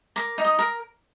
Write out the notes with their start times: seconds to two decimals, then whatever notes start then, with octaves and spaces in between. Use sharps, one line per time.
0.16 A#4 D6
0.38 D#4
0.44 D#6
0.59 A#4